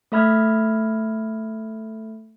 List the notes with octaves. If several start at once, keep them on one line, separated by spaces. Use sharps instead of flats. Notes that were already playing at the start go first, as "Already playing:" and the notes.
A3 A4 E5 B5 F6 G#6